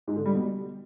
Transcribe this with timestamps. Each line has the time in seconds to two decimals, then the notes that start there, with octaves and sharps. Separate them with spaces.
0.07 G#2
0.17 D3
0.26 G3
0.35 B2
0.44 G3